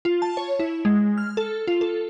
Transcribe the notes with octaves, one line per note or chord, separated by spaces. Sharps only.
F4
A5
C#5
E4
G#3
F6
A4
F4
A4